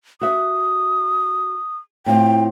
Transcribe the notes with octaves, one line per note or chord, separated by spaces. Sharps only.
F#4 E5 D#6
A2 C4 F4 G5